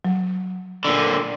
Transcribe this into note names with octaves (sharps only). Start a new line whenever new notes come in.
F#3
A#2 D3